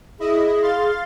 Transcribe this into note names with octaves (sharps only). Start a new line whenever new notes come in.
E4 G#4 D#5
F5 C6 A6